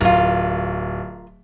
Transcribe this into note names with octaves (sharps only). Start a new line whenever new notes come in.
D1 F4 A#4